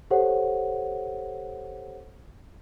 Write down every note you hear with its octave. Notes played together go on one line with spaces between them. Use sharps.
G4 A4 C5 C#5 F#5